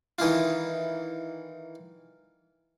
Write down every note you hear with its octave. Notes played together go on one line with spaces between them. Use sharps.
D#3 E3 E4 F4